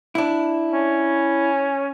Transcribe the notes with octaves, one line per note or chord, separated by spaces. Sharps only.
D4 E4
C#4